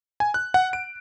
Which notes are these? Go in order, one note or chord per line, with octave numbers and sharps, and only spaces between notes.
G#5
F#6
F#5
D7